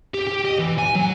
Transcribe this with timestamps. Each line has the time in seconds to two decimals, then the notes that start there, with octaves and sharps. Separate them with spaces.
0.14 G4
0.27 G4
0.45 D#5
0.59 E3
0.78 G#5
0.95 F#3